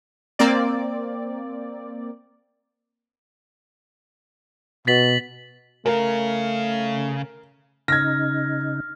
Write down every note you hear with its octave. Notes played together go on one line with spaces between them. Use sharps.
A#3 C4 D5
B2 A6 B6 F#7
C#3 A3 A#4 F5
C#3 D#4 F6 G#6 A#6